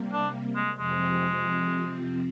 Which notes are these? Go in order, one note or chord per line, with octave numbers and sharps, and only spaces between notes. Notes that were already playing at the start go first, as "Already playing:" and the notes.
Already playing: C3 G3 A#3
D4
G#3
F2 C3 F3 G#3 C4